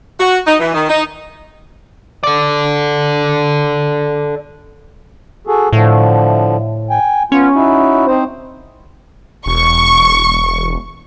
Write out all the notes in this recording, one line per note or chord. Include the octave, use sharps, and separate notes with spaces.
F#4
D#4
E3
D#3
D#4
A4 D5
F#4 G#4 A4
A2 D3 F3
G5 G#5
B3 C#4 F4
D#4 E4 F#4
C4 D#4 C5
E1 C#6